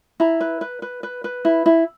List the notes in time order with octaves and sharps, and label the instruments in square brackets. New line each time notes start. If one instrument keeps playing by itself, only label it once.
[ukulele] E4 A#5
B4
B4
B4
B4
B4
E4
E4